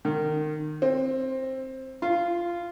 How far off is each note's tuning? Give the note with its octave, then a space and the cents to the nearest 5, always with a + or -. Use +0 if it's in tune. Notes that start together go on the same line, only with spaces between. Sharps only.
D#3 -30
C4 +10
F4 -15